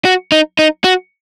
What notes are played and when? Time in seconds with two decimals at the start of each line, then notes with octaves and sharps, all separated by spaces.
0.05 F#4
0.32 D#4
0.59 D#4
0.84 F#4